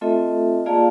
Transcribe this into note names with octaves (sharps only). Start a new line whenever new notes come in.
A3 C4 F4 A4 D#5 E5
A#3 F4 G#4 D5 F5 A5